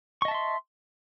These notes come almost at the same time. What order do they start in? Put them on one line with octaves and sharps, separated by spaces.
C#6 D#5 A5 E5 C6